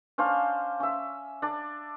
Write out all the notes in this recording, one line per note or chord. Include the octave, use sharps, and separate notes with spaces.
C#4 D4 C5 F5
C#4 E5
D4 D5